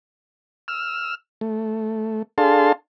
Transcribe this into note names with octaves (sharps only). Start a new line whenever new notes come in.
E6 F6
A3
D4 G#4 A4 F5 A5 C6